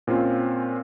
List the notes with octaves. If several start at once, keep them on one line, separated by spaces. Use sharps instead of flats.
A#2 C4 C#4 F4